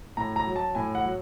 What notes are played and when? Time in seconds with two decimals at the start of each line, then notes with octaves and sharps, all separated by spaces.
0.17 A2 A#5
0.36 A#5
0.47 F#3
0.56 A5
0.75 A2 G#5
0.95 F#5
1.04 F#3